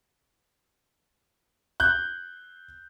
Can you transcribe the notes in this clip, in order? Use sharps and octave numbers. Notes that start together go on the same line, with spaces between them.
F#6 G6